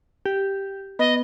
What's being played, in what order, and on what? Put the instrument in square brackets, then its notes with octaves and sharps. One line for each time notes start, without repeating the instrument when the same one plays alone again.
[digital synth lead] G4
[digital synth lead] B3 [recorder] D#5